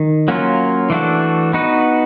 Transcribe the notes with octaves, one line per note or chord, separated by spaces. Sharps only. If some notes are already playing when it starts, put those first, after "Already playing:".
Already playing: D#3
F#3 A#3 C#4 F4
E3 A3 D4 F#4 A4
B3 D#4 F#4 B4